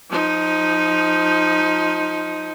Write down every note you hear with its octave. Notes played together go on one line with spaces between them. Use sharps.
F3 D#4